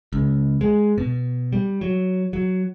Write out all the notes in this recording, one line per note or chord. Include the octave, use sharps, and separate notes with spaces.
C#2
G#3
B2
G3
F#3
F#3